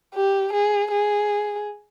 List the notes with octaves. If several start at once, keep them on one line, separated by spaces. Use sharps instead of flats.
G4
G#4
G#4